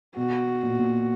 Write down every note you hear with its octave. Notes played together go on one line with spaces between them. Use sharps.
B2 F#4
A#2
A#2